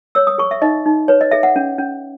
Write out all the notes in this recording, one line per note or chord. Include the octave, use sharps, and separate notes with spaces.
C#5 E6
D#6
G#4 C#6
E5
D#4 D#5
D#4
B4 C#5
D#5
G#4 E5
F#5
C#4
C#4